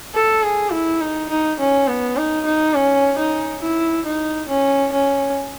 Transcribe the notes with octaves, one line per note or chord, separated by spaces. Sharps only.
A4
G#4
E4
D#4
D#4
C#4
B3
D#4
D#4
C#4
D#4
E4
D#4
C#4
C#4